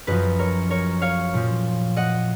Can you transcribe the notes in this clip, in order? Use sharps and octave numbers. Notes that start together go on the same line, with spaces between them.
F#2 F3 B4 D#5
A#4 C#5
A#4 C#5
C#5 F5
A#2 F3
D#5 F#5